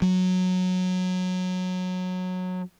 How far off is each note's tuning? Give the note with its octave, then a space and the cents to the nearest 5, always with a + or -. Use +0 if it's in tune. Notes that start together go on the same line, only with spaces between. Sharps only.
F#3 -15